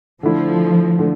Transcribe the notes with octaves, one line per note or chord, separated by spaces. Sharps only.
D3 F3 A3 E4
D3 A3